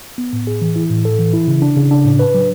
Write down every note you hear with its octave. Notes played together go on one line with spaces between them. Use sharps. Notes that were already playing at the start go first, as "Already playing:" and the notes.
B3
A2
G#4
E3
E4
A2
A4
E3
E4
C#3
D4
C#3
D4
A2
B4
F#3